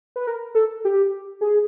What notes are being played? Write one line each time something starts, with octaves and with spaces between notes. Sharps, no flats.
B4
A#4
A4
G4
G#4